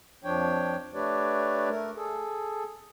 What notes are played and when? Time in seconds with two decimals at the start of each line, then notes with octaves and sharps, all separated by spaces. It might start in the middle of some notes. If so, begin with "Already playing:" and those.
0.24 F2 F3 D4 C#5 G5
0.94 A3 D4 G4 B4 C#5 D5
1.69 A3 A#4
1.96 G#4 A4